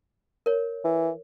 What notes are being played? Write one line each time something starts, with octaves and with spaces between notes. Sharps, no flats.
A#4 C#5
E3